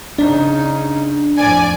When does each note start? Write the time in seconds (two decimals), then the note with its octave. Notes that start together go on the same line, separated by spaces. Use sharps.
0.18 C#3 D4 D#4
1.37 F2 A2 D5 G#5